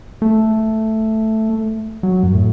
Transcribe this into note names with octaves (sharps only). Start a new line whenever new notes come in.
A3
F#3
F#2
A2